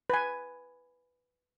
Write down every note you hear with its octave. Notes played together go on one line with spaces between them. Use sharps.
B4 G#5